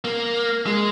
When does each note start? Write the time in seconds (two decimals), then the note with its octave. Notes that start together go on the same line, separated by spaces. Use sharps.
0.04 A#3
0.66 G#3